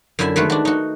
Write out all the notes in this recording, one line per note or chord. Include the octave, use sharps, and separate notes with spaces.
F#2 D3 E4 E5 G#5
D#3 G#3 A3 F#4 B4
D4 F#4
D#4 F#4